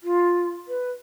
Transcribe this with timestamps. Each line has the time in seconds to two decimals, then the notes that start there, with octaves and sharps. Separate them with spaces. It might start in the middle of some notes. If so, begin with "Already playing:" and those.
0.03 F4
0.68 B4